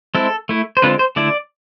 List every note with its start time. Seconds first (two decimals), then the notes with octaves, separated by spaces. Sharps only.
0.15 G#3 C4 E4 A4
0.49 A3 E4
0.77 C5
0.82 D3 G#3 C4 F4 B4
0.99 C5
1.16 D3 A3 E4 D5